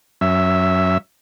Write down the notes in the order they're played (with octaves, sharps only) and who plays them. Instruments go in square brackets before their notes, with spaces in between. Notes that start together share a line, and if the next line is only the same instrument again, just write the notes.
[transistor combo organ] F#2 E5